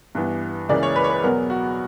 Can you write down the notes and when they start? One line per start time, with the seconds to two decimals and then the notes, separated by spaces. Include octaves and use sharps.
0.15 G2 E3 B3
0.69 C#2 C#3 E3 A#3 D5
0.83 C#5
0.96 B4
1.04 C#5
1.10 B4
1.23 E2 B2 F#3 B3 A#4
1.50 F#4